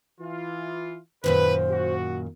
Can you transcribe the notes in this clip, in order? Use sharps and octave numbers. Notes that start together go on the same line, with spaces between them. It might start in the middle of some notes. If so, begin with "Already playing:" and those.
E3 F4
F#2 A#2 D#3 B4 C5
F#4